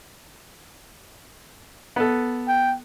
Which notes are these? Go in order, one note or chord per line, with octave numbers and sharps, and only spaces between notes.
B3 A4
G5